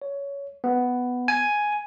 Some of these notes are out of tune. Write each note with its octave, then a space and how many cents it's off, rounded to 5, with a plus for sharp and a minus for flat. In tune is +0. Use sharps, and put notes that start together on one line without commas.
C#5 +15
B3 +5
G#5 +5